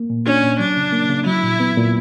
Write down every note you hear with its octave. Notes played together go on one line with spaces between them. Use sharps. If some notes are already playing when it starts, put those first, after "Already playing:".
Already playing: A#3
A#2
C#4 D4
A#2
F#3 D4
C#3
A#3
C#3
F#3 E4
A#2
B3
A#2